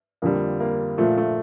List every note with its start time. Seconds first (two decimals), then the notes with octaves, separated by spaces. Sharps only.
0.22 F2 D3 G3 A#3
0.60 A#3
0.98 A#2 F3 A3
1.17 A3